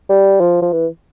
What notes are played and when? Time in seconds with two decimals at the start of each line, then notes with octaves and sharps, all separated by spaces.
0.10 G3
0.41 F3
0.62 F3
0.73 E3